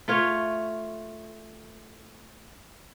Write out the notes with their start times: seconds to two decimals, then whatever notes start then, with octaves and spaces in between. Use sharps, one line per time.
0.08 A3 F4 C#5